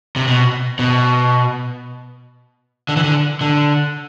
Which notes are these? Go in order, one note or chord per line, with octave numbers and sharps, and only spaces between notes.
C3
B2
B2
D3
E3
D3
D3